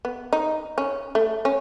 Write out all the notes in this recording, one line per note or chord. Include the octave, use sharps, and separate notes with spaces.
B3
D#4
C#4
A3
C#4